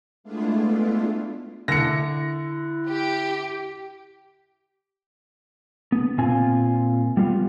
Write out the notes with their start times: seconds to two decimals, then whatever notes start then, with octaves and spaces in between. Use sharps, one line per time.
0.24 G#3 A3 B3 D4 E4 F4
1.68 D3 E4 A#6 C#7
2.88 G4
5.92 B3
6.18 A#2 C4 F4 G#5
7.17 G3 B3 F4